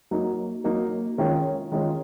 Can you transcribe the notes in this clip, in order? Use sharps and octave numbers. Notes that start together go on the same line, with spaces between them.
F#3 A#3 D#4
F#3 A#3 D#4
D#3 G#3 C#4 F4
D#3 G#3 C#4 F4